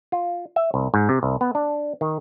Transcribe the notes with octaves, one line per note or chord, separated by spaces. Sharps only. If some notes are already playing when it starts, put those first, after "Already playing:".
F4
E5
C2
G#2
C3
C2
B3
D4
D#3